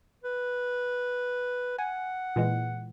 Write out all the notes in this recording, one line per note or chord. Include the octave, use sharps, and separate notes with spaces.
B4
F#5 G#5
A#2 E3 G#3